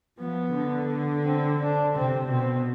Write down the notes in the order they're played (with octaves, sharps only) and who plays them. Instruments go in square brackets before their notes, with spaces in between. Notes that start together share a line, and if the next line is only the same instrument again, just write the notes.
[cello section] F3 [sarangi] B3
[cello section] D3
[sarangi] C4
D4
[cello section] C3 [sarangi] C4
[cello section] B2 [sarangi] C4